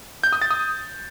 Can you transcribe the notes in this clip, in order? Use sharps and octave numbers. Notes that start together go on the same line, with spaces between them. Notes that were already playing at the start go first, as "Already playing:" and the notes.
G6
D#6
A6
D#6